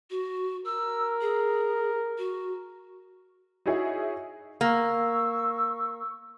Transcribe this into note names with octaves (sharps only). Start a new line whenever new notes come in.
F#4
A#4 E6
G#4
F#4
D#4 E4 F#4 G#4 C#5 E5
A#3 C#6 E6